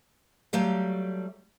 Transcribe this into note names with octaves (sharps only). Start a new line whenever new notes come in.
F#3 G3 A3 G4 F5